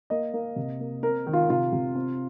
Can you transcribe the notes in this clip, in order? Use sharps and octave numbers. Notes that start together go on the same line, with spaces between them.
A#3 D#5
A#3
C3
A#3
C4 A#4
D#3
F4
C3 F4
C3
C4